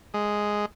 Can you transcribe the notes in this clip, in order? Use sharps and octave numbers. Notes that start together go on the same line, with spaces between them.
G#3